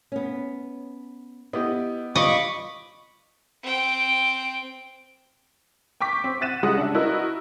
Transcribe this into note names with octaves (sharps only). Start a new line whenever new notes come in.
B3 C#4
B3 E4 G4 D#5
G3 F4 D#5 B5 C#6 D6
C4 G5
G5 C#6 D6 B6
C4
E5 F#5 F#6 A6 D#7 E7
C#3 G3 G#3 F#5 D#6 F#6
D4 E5
E4 F#4 A#4 B4 D#5 E6